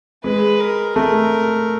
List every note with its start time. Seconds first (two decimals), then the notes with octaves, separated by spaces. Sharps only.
0.24 G#3 B4
0.60 A#4
0.96 A3 A#4